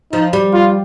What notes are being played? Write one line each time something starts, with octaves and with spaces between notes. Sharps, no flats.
F3 D#4
G3
F4